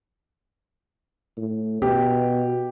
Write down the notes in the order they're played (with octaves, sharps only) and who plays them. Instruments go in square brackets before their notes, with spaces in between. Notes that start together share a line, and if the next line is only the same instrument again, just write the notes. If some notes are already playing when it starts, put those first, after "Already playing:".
[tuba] A2
[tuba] B2 [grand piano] G4